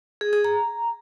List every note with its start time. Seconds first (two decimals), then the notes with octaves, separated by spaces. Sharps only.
0.21 G#4
0.33 G#4
0.45 A#5